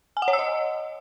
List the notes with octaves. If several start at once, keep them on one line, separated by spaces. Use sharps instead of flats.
G#5
F#5
C#5
E6
D#5